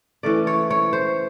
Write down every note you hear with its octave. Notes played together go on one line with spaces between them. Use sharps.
E3 A3 C#4 D5
C#5
C#5
C5